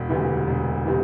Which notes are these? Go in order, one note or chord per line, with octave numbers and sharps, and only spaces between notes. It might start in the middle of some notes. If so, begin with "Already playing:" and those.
Already playing: E1
D2 C3 E3
E1
C3 E3